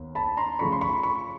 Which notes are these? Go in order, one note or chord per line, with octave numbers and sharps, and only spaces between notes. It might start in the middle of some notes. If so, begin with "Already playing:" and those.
Already playing: D#2 B3
A5 B5
A#5 C6
C#3 F3 A3 C#4 B5 C#6
C6
B5 C#6
B5 C#6